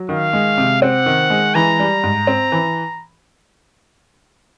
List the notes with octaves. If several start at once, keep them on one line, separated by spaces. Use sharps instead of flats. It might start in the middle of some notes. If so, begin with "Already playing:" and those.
Already playing: F#3
D#3 F5
G#3
C3
C4 F#5
D#3
G#3
E3 A#5
G3
G#2
C4
E3